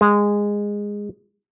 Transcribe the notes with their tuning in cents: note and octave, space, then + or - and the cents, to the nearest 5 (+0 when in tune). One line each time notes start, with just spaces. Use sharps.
G#3 -15